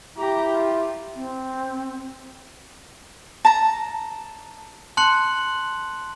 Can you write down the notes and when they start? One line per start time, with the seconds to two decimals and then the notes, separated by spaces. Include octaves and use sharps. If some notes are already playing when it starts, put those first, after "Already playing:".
0.17 E4 G4 A#5
0.54 F4
1.16 C4
3.45 A5 A#5
4.97 A5 C6 F#6 C#7 F#7